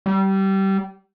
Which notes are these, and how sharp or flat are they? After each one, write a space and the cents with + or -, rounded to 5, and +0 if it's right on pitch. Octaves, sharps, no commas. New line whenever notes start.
G3 -20